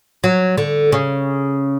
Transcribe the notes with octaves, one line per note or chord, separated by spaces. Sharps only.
F#3
D3
C#3